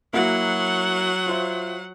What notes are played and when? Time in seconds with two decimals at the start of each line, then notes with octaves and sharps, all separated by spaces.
0.13 F#3 A#3 E4 F#4 F#5
1.26 F4 C5 E5